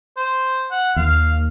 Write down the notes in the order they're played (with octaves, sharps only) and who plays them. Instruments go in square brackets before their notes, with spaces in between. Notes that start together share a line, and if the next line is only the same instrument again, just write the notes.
[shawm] C5
F#5
[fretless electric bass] D#2 [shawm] F5